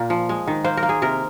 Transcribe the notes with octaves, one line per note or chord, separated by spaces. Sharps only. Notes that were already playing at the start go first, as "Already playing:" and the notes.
Already playing: A#2 A#3
F3
G#3
D#3
A#3 C5
A#4
A#3
G#4
C3 A#4